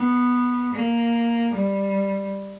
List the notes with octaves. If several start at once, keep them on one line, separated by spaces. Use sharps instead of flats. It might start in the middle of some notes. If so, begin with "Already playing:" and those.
Already playing: B3
A#3
G3